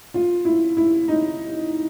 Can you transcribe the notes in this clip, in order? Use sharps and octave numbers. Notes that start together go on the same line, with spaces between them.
F4
E4
E4
D#4